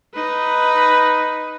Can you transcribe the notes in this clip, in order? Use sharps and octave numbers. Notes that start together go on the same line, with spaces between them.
D#4 B4